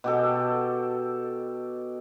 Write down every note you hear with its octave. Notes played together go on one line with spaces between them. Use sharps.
B2 G4 A4